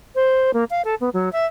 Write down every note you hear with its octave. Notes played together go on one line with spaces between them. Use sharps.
C5
A#3
F5
A4
B3
F#3
E5